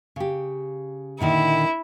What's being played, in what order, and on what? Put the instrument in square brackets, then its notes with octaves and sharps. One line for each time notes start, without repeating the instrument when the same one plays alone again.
[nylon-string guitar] C#3 G4
[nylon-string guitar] A#2 D3 D#3 [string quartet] E4